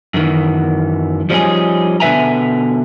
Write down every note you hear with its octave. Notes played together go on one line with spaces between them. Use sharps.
F#2 D#3 E3
F3 G3 B3 C#4 D#4 G#4
B2 D3 B4 E5 G#5 A#5